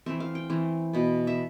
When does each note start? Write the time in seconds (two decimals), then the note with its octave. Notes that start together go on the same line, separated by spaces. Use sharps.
0.06 E3 A3 C4 E5
0.20 F5
0.35 G5
0.50 E3 A3 C4
0.93 B2 B3
1.27 E5